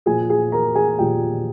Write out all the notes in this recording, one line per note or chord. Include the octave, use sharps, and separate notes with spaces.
A#2 F3 G#4 G#5
G#4 G#5
A#4 A#5
G#4 G#5
A#2 F3 G4 G5